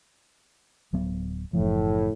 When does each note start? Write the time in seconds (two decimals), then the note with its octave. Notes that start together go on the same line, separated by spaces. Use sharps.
0.93 D1 F#3 B3
1.53 F#1 A2 E3 F3